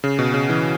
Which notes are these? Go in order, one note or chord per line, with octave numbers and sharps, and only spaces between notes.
C#3
B2
C#3
E3